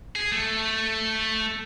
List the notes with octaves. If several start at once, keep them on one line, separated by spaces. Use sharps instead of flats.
G#4
A3